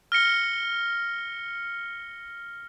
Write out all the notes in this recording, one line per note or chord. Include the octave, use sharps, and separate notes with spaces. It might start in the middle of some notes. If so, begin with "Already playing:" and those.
F6 A#6 C#7 G7